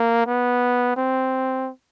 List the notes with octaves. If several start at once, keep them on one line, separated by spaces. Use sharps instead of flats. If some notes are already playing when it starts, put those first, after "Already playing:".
Already playing: A#3
B3
C4